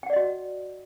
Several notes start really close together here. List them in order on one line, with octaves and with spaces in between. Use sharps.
G5 F#5 D5 D#5 F#4